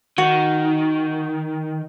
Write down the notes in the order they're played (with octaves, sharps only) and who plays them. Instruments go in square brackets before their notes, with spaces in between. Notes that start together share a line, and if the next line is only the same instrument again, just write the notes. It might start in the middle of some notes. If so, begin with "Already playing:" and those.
[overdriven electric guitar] D#3 [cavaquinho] F#4